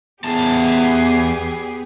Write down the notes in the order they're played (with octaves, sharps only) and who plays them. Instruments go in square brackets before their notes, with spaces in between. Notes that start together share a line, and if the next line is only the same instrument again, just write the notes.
[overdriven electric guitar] E2 A5 [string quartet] B3 G4 G#4